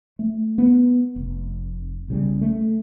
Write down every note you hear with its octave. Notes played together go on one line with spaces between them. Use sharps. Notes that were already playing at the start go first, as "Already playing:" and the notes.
A3
B3
F1
B1 C#3 G3
A3